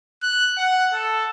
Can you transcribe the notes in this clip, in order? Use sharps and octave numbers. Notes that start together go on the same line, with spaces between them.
F#6
F#5
A4